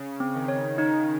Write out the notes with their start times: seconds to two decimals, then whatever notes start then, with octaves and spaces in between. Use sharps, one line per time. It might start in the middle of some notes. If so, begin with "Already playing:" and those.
Already playing: C#3
0.20 C4
0.35 D#3
0.48 C#5
0.78 D#3 D#4